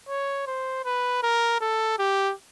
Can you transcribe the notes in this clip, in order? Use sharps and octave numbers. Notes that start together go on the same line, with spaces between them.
C#5
C5
B4
A#4
A4
G4